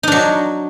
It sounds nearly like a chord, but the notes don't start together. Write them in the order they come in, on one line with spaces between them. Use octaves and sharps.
D#4 D4 F#3